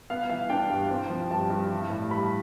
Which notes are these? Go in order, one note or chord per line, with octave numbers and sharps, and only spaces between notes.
B3 F5
E3 F5
D4 G5
G2
C4
F3
G2 A5
G2
E3
A2
G3 B5